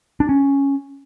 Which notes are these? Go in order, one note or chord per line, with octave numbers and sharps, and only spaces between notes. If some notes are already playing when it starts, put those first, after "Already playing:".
D4
C#4